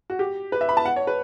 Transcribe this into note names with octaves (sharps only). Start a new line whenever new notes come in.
F#4
G4
B4
E5
B5
A5
F#5
C#5
B4